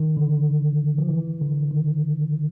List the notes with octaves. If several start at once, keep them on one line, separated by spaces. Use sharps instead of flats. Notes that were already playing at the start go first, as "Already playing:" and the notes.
Already playing: D#3
D3
F3
E3
D3
D#3